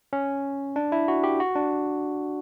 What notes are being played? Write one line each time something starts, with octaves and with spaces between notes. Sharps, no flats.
C#4
D4
E4
F#4
G4
F#4
D4